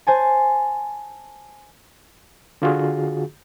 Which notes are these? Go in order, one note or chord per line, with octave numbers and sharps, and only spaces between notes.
C5 G#5 A5
D3 F4 F#4 G#4